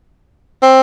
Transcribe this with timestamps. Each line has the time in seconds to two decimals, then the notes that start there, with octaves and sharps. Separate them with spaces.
0.62 C4